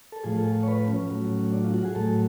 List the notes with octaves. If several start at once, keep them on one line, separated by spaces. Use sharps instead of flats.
A4
A2 F3 G#4
A4
C#5
B4
C#4
A2 F#3
D4
F4
F#4
G#4
A2 F#3 A4